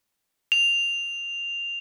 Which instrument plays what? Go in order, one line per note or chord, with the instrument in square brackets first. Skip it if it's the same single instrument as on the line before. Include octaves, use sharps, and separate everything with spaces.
[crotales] F7